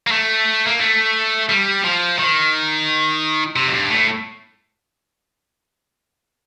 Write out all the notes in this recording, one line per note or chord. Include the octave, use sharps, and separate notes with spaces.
A#3
A3
A#3
A3
G3
F3
D#3
C3
F2
G2
A2